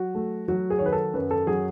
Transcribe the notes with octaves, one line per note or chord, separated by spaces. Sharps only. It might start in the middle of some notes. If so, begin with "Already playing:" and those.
Already playing: F#3 F#4
A3
F#3 F#4
G#4
D#3 C#5
B4
A4
F#2 B4
A4
F#3 G#4